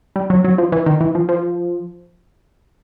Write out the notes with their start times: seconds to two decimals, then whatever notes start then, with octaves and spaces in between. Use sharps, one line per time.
0.16 G3
0.30 F#3
0.45 F#3
0.58 F3
0.72 E3
0.86 D#3
1.01 E3
1.15 F3
1.29 F3